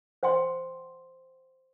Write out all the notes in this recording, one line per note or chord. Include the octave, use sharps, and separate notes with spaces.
C5 F#5 G5 C6